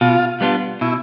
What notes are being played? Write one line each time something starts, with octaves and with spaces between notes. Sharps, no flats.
B2 F4
G3 B3 D4 F4
B2 E4